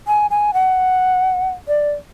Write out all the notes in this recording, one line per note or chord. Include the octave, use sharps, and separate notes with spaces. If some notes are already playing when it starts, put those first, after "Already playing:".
G#5
G#5
F#5
D5